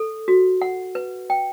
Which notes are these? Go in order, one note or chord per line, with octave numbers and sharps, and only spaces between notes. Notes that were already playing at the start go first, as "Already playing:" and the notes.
Already playing: A4
F#4
F#5
B4
G5